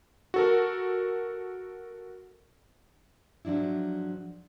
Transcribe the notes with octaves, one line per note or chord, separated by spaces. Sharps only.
F#4 A4 A#4
G#2 F3 F#3 D4 E4